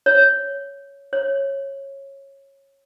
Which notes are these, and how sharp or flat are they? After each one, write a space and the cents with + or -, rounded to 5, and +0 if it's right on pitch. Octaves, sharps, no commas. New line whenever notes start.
C#5 +10
C#5 -15